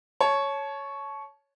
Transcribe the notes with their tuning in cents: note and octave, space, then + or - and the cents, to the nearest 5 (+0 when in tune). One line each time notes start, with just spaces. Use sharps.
C#5 +0 A5 -25